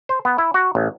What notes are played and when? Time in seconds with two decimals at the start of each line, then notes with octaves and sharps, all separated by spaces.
0.09 C5
0.25 B3
0.38 E4
0.54 F#4
0.75 A1